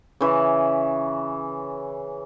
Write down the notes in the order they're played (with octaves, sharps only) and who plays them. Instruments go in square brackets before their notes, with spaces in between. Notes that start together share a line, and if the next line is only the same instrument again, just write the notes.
[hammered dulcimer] C#3 E3